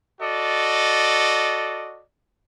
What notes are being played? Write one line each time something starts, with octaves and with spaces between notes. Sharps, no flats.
F#4 A4 D5 D#5